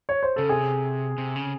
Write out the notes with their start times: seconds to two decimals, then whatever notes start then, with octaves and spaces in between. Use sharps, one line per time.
0.09 C#5
0.23 C5
0.36 C#3 A4
0.49 C3 G#4
1.18 C3
1.36 C#3